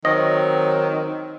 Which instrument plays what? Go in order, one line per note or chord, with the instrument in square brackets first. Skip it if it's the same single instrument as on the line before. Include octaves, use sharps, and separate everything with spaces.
[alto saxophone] D#3 [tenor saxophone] F#3 [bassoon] C4 [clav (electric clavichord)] D#5